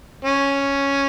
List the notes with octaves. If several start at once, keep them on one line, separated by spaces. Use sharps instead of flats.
C#4